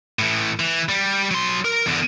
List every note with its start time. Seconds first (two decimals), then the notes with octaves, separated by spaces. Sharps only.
0.19 A2 E3
0.60 E3
0.89 G3
1.31 F#3 C6
1.65 A#4
1.86 E2 D3